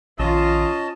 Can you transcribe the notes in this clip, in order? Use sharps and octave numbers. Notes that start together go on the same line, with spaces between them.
A#1 D#3 C#4 F4 D#5 A5